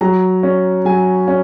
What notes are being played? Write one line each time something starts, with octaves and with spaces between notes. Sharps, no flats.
F#3 A#5
C#4
F#3 G#5
C#4